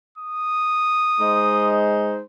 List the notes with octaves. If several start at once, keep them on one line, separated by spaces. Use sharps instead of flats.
D#6
G#3 D#4 C5